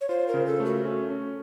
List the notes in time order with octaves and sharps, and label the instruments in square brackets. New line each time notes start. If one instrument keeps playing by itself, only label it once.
[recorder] C#5
[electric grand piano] F4 [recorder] C5
[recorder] A#4
[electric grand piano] C#3
[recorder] A4
[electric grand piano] A3
[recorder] F#4
[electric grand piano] C#4
C#4